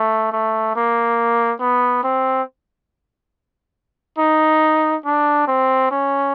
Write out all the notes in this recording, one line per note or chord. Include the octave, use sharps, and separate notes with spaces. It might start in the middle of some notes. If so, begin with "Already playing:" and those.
Already playing: A3
A3
A#3
B3
C4
D#4
D4
C4
C#4